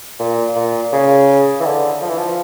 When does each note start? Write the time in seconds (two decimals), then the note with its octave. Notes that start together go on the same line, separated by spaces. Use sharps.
0.20 A#2
0.56 A#2
0.92 C#3
1.60 E3
1.65 D3
2.02 F3
2.09 E3
2.18 F3